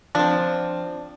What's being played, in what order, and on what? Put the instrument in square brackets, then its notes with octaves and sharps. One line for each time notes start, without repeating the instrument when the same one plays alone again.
[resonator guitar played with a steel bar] F3 C4 [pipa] D4